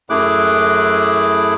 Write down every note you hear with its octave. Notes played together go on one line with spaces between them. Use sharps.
F#2 A3 E4 G#4 D6 F#6